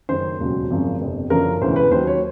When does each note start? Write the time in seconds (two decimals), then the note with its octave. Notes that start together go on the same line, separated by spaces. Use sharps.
0.09 F#1 F#2 D#3 C5
0.39 E1 D#2 C#3 F#3
0.70 G#1 F#2 C#3 F3
1.01 G1 F2 C3
1.30 F#1 F#2 D3 F3 A#4
1.61 E1 D2 C#3 E3 C5
1.76 B4
1.91 D#2 D#3 F#3 C5
2.07 C#5